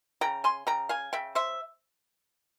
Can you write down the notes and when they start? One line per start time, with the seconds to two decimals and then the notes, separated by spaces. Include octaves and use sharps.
0.21 C#3 G5 A#5
0.44 G#5 C6
0.67 C#3 G5 A#5
0.89 F5 G#5
1.13 C#3 E5 G5
1.35 C5 E5